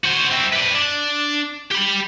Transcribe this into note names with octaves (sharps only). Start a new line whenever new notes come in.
F#4 C5
C4 E4
B4 D5
D4
G4 B5